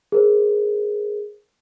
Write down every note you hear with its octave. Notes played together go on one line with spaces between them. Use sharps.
G#4 A#4 C5